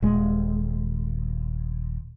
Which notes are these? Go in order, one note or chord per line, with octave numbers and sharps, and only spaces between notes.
D#1 G#3